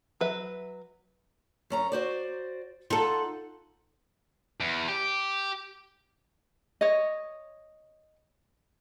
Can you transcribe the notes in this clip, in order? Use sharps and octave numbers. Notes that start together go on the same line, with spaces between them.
F#3 B4 E5
F#2 C#4 A#5
F#4 C5 D5
D#4 F4 A4 F#5
E2
G4
C#5 D#5